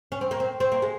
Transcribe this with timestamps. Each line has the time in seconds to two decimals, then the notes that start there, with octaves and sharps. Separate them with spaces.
0.12 C#4
0.21 C4
0.31 A#3
0.40 C4
0.60 C4
0.72 A#3
0.82 G#3